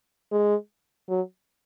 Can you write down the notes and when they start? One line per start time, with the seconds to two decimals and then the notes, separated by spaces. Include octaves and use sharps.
0.32 G#3
1.09 F#3